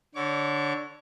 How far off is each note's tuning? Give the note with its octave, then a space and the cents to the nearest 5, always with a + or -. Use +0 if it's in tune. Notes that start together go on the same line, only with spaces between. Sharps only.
D3 +0 C#5 +0 D6 -40